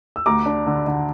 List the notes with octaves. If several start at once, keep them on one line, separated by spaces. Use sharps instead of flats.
E6
D2 A#5 D6
D4
D3
D3